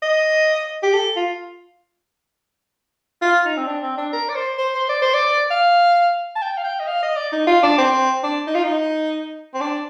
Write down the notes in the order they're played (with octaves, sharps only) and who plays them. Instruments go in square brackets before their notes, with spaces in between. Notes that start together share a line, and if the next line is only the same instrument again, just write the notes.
[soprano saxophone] D#5
G4
A4
F4
F4
D#4
C4
D4
C4
D4
A#4
D5
C5
C5
C5
D5
C5
D5
F5
A5
G5
F5
G5
D#5
F5
D#5
D5
D#4
F4
D4
C4
D4
D#4
F4
D#4
C4
D4